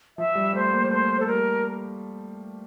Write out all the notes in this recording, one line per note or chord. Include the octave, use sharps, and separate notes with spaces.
F3 E5
G3
A3 C5
A#3
A3 C5
A4
G3 A#4